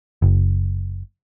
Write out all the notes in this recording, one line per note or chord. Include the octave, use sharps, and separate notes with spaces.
F#1